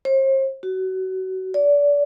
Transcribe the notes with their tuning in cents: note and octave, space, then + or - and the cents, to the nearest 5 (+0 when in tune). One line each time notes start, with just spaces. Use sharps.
C5 +40
F#4 +25
D5 -30